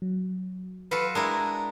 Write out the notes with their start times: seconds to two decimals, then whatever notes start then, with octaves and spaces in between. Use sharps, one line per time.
0.02 F#3
0.91 F4 F#4 A4 B4
1.15 G#3 D4 E4 A#4 A5 A#5